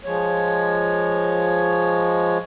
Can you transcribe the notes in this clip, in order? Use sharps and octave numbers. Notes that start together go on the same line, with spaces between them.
F3 G#3 C#5